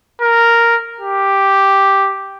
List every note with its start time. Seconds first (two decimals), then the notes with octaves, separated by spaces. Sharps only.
0.21 A#4
1.00 G4